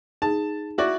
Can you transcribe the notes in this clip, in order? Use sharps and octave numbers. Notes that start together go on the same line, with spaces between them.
D#4 G#4 A5
E4 F#4 D5